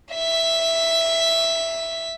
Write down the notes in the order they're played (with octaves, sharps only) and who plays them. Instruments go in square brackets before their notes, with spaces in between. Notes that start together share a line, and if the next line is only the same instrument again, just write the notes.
[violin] E5 B6